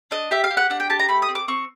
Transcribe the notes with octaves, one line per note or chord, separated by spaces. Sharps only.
D4 D#5
G4 E5
F5
G4
F#5
D4 F#5
G5
G4 A5
A#5
A3 B5
D#6
C4
D6
C4 C#6